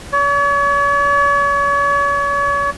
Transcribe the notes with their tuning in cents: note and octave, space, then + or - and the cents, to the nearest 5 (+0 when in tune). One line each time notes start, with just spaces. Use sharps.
C#5 +40